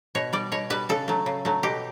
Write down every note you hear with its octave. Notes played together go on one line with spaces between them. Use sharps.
B2 C#5
G3 D5
B2 C#5
G3 B4
C#3 A4
F#3 A3
C#3
F#3 A3
B2 G4